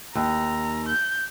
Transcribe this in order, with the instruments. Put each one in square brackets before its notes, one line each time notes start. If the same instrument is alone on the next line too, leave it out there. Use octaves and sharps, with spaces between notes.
[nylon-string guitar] D#2 [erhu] A#5
[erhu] G6